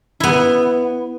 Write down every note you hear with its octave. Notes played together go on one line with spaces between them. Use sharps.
B3 E4